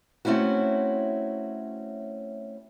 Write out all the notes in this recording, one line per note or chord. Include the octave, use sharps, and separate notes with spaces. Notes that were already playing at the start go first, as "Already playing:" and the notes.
A3 C4 C#4 E4 F#4